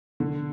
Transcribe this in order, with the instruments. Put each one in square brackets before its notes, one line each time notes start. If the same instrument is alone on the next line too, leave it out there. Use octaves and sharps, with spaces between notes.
[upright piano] D3